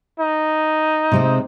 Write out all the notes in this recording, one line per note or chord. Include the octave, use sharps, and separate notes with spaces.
D#4
C3 G#3 C4